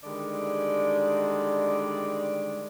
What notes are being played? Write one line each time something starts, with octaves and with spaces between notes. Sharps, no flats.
D3 D#3 G3 G#3 D5